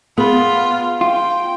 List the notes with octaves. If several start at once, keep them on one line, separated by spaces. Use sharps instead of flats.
B3 F4 G#4 B5
F4 G5